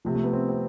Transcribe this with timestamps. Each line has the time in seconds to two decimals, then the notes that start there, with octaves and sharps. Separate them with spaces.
0.05 C3 F3 A3
0.15 A3
0.24 B3
0.33 C4
0.49 C4